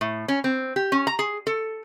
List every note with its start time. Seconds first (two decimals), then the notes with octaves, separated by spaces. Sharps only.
0.01 A2
0.28 C#4
0.44 C4
0.76 G4
0.92 C#4
1.07 A#5
1.19 G#4
1.47 A4